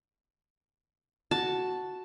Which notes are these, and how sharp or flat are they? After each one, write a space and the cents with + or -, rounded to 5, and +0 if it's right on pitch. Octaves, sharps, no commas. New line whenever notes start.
F#4 +0 A5 +0